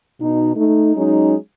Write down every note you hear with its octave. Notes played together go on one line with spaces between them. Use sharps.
B2 D#4
A3 D#4
F#3 G#3 C#4 D#4